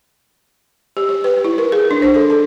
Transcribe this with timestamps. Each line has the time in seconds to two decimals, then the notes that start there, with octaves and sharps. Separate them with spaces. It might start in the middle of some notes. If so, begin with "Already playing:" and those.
0.97 G4
1.09 G4
1.24 B4
1.44 E4
1.58 A#4
1.72 G#4
1.91 D4
2.02 C5
2.14 A4
2.30 A4